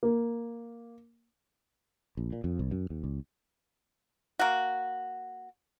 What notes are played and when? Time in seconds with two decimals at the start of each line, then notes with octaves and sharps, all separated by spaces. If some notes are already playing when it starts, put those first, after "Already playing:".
0.03 A#3
2.17 A#1
2.33 A#2
2.44 F2
2.59 C2
2.71 F#2
2.90 D#2
3.04 C#2
4.39 A#3 F#4